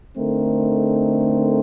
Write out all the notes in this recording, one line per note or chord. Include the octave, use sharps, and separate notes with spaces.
D3 A3 C4 D#4 A#4